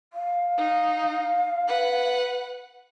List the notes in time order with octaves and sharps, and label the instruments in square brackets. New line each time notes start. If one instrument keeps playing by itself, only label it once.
[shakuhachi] F5
[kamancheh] D#4
B4 F#5